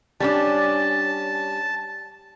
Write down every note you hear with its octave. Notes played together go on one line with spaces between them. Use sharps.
G3 C#4 D4 A5